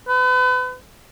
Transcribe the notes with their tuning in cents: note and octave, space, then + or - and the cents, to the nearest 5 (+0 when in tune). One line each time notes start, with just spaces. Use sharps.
B4 +35